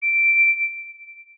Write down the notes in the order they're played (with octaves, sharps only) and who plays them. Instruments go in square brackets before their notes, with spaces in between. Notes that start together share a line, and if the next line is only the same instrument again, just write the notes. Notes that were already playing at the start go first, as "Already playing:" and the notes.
[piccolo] D7